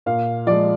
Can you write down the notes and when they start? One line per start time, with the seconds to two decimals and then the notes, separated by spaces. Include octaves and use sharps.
0.06 A#2 F5
0.46 F3 G#3 D5